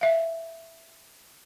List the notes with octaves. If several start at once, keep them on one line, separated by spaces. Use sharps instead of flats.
E5 F5